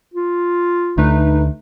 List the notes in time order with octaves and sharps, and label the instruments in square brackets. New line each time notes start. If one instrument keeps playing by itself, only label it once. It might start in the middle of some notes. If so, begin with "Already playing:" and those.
[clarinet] F4
[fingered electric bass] D2 [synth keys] A3 D#4 B4